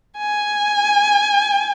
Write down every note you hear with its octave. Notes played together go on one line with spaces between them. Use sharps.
G#5